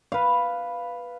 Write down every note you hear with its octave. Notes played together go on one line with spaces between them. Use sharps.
B4 F5